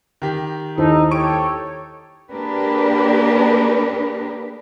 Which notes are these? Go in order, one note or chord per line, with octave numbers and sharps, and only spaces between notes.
D#3 G4
D#2 D#4 E4 A4 C5
G4 A4 C#5 C#6 D7
A#3 D4 G4 G#4 A#4 B4